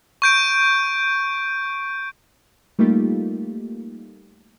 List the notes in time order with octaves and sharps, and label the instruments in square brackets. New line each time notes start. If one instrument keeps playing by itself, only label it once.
[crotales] C#6 G6 D7
[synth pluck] G3 A3 A#3 D#4 F4 G4